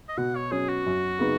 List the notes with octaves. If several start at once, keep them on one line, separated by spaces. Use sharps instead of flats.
D#5
B2 F#5
C#5
F#3 C#4 G#4
F#4
F#2
C#3 B3 D#4